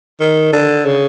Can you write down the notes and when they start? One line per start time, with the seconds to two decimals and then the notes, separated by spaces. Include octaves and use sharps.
0.20 D#3
0.53 D3
0.86 C#3